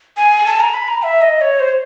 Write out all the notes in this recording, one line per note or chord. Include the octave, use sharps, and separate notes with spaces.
G#5
A5
A#5
B5
A#5
E5
D#5
C#5
C5